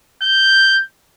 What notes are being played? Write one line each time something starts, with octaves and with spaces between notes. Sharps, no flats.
G6